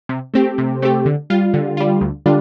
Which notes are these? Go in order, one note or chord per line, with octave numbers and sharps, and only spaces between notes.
C3
A3 C4 G4
C3
A3 C4 G4
D3
G3 F4
D3
G3 F4
D2
D3 G3 D4 F4